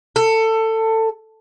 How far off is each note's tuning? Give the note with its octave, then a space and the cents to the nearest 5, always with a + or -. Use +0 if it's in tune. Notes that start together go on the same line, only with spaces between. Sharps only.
A4 +20